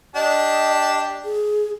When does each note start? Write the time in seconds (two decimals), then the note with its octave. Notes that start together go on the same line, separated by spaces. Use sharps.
0.15 D4 G4 D#5 A5
1.25 G#4